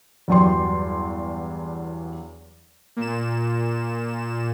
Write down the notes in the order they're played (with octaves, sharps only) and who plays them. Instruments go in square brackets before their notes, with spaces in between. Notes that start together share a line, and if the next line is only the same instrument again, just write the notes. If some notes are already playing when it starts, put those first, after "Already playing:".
[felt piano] E2 G2 F#3 D5 G5 C6
[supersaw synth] A#2 E7